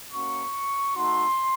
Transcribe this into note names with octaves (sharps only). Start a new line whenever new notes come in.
A#3 C#4 F#4 C#6
A3 D#4 F#4 C6